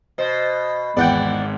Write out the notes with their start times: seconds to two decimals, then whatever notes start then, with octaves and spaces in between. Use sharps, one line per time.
0.18 B2 C5
0.97 G#1 E2 E3 D5 F#5 G5